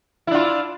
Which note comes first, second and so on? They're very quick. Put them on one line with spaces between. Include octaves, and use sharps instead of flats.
E4 D4 F4